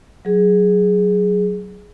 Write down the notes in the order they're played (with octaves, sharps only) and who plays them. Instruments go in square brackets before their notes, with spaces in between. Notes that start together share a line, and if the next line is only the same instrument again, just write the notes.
[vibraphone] F#3 G#4